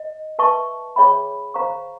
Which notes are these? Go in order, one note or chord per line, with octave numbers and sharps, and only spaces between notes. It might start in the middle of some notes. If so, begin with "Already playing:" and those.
Already playing: D#5
B4 E5 A5 C#6
G#4 C#5 E5 G5 B5
C5 F5 A#5 C#6